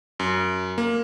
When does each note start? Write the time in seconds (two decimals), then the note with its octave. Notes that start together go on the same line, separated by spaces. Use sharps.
0.20 F#2
0.78 A#3